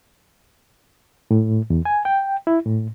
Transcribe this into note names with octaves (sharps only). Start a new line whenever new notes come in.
A2
E2
G#5
G5
E4
A2